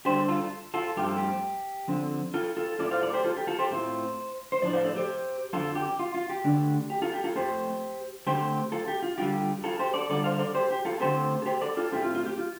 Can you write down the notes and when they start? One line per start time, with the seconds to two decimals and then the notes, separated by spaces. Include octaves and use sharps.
0.05 D3 G3 D4 G4 C5
0.28 F4 A4
0.74 F4 A4
0.97 G2 F3 A3 C4 F4 G4
1.07 A4
1.17 G4
1.88 D3 F3 C4
2.34 F4 A4
2.57 F4 A4
2.79 A2 A3 C4 F4 A4 D5
2.91 C5 F5
3.02 A4 D5
3.13 G4 C5
3.24 F4 A4
3.37 G4
3.47 F4 A4
3.59 G4 C5
3.71 A2 A3 C4 F4
4.52 C5
4.62 A2 F3 D4 D5
4.73 C5 F5
4.84 A4 D5
4.96 G4 C5
5.53 F2 D3 F3 F4 A4
5.75 G4
5.99 F4
6.14 F4
6.30 G4
6.44 D3 A3 D4
6.90 G4
7.02 F4 A4
7.13 G4
7.24 F4 A4
7.35 F2 F3 A3 G4 C5
8.26 D3 A3 C4 G4 C5
8.72 F4 A4
8.88 G4
9.02 F4
9.18 D3 G3 F4 G4
9.64 F4 A4
9.79 G4 C5
9.94 A4 D5
10.09 D3 G3 D4 F4 A4 D5
10.24 C5 F5
10.39 A4 D5
10.55 G4 C5
10.71 G4
10.85 F4 A4
11.00 D3 A3 C4 F4 G4 C5
11.42 A4
11.46 G4 C5
11.61 A4 D5
11.77 F4 A4
11.92 A2 A3 C4 F4 G4
12.03 F4
12.15 F4
12.26 G4
12.38 F4